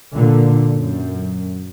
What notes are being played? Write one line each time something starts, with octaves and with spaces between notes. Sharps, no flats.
A#2 D3
F#2